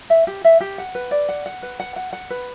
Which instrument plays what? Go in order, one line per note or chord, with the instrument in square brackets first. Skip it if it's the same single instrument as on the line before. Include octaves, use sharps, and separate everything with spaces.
[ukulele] E5
G4
E5
G4
F#5
B4
D5
F#5
F#5
B4
F#5
F#5
F#5
B4